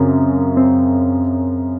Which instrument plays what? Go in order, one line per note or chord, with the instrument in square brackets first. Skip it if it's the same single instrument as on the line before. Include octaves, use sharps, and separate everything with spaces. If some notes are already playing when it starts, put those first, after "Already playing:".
Already playing: [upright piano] F#2 C#3 [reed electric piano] C4
[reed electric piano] C4